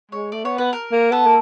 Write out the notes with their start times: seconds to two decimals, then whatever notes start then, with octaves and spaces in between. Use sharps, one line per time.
0.12 G#3 C#5
0.32 A3 D5
0.45 B3 C#5
0.58 B3 B4
0.73 A#4
0.92 A#3
1.12 B3 A4
1.26 A#3